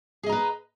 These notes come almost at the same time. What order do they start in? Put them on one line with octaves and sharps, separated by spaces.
G#4 D#5 A#5 B4